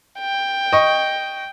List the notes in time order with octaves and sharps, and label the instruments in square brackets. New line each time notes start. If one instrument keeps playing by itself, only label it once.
[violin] G5
[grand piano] D#5 C#6